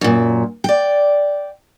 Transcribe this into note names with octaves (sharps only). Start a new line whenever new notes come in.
F#2 A#2
D5 G5